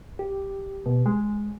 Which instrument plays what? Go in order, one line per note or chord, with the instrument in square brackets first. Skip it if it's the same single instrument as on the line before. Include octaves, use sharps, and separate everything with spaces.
[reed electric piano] G4
[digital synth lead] B2
G#3